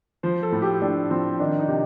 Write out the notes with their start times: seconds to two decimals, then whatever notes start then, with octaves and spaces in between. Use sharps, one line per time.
0.23 F3 C5
0.43 A4
0.52 A2
0.62 G4
0.82 A2 D4
1.10 F3 C4
1.39 D#3 D4
1.59 D#4
1.68 C3